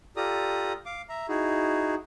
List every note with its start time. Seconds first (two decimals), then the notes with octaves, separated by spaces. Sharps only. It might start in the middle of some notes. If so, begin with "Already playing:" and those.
0.17 F4 G4 A4 D5 A#5 D#6
0.86 F5 D6
1.09 E5 A#5
1.28 D#4 E4 F#4 G#4